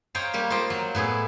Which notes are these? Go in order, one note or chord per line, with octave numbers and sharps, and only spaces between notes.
C5 C#5 D#5 F5 G5 A#5
G3 A#3 G4
F4 C5 D#5 G5
F#3
A2 B3 E4 G#4